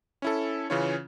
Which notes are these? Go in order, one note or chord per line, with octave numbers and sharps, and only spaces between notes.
C#4 E4 A4
C#3 E3 C#4 F4 C#5